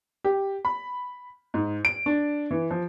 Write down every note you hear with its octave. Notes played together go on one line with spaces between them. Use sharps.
G4
B5
G#2
D7
D4
E3
F3